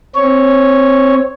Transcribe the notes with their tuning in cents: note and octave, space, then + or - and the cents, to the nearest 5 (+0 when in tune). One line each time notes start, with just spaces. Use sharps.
C4 +5 C#5 +0